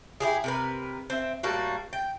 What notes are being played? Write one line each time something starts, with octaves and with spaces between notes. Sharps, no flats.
E4 G4 G#4
C3 A#4 B4
C4 E5
A2 G3 A#3 F#4
G5